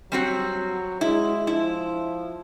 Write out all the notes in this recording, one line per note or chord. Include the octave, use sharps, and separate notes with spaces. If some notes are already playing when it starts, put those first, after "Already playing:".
F#3 G3 C4 F#4
G#3 E4
F3 E4